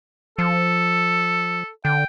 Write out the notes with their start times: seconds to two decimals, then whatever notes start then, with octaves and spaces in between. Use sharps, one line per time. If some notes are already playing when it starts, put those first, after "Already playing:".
0.39 F3 A4
1.85 D3 G5